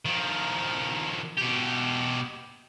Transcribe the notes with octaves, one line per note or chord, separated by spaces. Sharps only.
D#3 F3
B2 G4